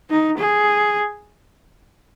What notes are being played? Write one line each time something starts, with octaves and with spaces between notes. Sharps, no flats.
D#4
G#4